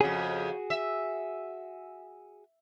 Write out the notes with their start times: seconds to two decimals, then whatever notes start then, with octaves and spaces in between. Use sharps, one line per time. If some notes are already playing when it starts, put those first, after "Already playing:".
0.01 F2 C#3 F#4 G#4
0.70 E5